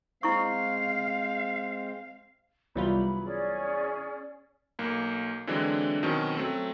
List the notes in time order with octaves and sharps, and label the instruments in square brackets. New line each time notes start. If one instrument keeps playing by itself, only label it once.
[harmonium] G#3 C4 C5 [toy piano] E4 C#6 [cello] F5
[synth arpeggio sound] C2 G3 F4 [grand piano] E3 F#3 B3 [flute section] B5
[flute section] C#4 G#4 D5
[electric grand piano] B1 A#3
D3 E3 F#3 G#3 C4 D4
B2 D#3 F#3 C4 C#4
F#3 A3 C4